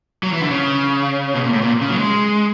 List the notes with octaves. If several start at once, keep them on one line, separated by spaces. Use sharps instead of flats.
F#3
E3
D3
C#3
B2
A#2
A2
A#2
C#3
F#3
G#3